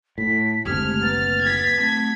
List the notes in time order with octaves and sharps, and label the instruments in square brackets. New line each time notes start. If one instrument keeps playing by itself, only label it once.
[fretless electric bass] A2 [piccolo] B6
[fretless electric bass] F#1 D2 C3 [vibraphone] G#3 A3 G4 [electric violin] F6 [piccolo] G#6
[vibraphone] F#3 A#3 B4 [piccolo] A6
[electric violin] G#6 B6
[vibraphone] F#3 A3 C4